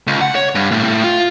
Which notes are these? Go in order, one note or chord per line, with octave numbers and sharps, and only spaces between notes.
C#2
F#5
C#5
G2
A2
A2
F4